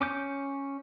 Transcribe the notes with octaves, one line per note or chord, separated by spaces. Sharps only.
C#4 D6 G6